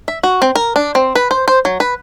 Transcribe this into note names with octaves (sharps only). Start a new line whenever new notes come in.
E5
F#4
C4
A#4
D4
C4
B4
C5
C5
F#3
B4